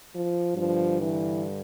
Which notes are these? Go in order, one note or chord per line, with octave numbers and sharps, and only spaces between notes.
F3
G2 D3 F3
E3